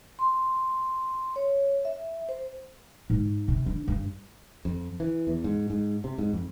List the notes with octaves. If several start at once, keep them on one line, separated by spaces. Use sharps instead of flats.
C6
C#5
E5
C5
G#2
C3
D4
G2
F2
E3
E2
G#2
G#2
C3
G#2
F2